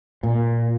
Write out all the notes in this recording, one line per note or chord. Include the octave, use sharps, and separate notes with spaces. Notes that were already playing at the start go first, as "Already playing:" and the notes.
A#2